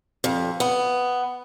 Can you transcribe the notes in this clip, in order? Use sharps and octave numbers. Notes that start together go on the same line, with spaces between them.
F2
B3